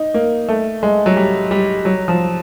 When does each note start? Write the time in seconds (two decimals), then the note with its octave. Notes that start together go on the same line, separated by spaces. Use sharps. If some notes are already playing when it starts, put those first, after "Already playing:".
Already playing: D#4
0.14 A#3
0.49 A3
0.83 G#3
1.06 F#3
1.17 G3
1.51 G3
1.85 F#3
2.08 F3